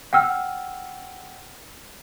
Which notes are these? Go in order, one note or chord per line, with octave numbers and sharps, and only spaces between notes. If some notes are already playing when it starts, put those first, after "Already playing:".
F#5 G5 E6 F6